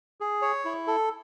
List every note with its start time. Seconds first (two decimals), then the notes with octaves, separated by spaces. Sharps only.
0.21 G#4
0.42 C#5
0.65 E4
0.87 A4